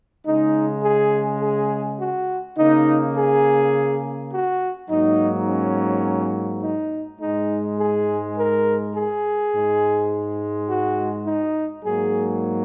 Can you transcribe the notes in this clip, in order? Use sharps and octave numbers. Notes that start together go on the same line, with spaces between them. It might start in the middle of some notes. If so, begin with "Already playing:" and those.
C#3 G#3 D#4
G#4
G#4
F#4
C#3 A#3 D#4
G#4
F#4
G#2 F#3 A#3 D#4
C#4
D#4
G#2 G#3 D#4
G#4
A#4
G#4
G#2 G#3
F#4
D#4
G#2 F#3 A#3 G#4